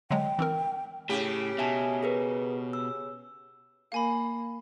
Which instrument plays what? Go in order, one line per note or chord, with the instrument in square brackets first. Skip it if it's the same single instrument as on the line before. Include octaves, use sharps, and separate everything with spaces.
[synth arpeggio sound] D3 F#3 G#3 [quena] G5
[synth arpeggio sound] E3 C4 A#4
[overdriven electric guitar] A2 [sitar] C#3 G4
[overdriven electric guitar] B2 [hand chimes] E5 G#5 A5
[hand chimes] G#4 A#4 B4
E6
[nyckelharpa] A#3 [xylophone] F5 G#5 B5